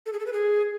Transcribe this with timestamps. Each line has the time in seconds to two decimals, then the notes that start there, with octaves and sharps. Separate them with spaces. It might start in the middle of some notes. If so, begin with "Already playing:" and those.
0.06 A4
0.13 G#4
0.20 A4
0.26 B4
0.33 G#4